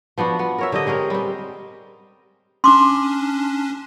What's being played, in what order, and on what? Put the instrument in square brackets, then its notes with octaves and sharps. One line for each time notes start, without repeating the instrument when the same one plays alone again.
[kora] F3 B3 D4 F#4
B3
A#4 C#5 E5
D3 G4 D#5
G#3 C4 C#4 A#4
G3 C4
[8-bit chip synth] C#4 D4 [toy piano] C6 D6